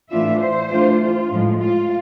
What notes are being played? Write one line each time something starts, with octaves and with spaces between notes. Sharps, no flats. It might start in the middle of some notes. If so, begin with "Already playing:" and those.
A2 E3 A3 D4 F4 E5
C5
E3 A3 D4 F4
F4
A2 F3 G#3
F4